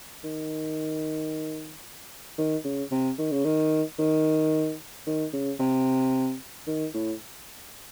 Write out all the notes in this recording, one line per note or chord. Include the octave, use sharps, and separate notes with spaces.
D#3
D#3
C#3
C3
D#3
C#3
D#3
D#3
D#3
C#3
C3
D#3
A2